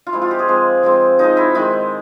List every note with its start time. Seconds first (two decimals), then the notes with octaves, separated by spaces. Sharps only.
0.07 F4
0.13 F3 G#3 C4 E4
0.22 F4
0.31 G4
0.39 G#4
0.48 F3 G#3 C4
0.83 F3 G#3 C4
1.19 F3 G#3 C4 D#4
1.37 E4
1.55 D#3 G#3 C4 E4